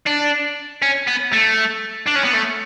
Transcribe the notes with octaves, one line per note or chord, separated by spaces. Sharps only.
D4
C#4
B3
A3
D4
C#4
B3
A3